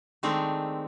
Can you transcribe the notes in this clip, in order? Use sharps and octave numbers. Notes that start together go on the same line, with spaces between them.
D#3 G#3 A3 C4 D4 D#4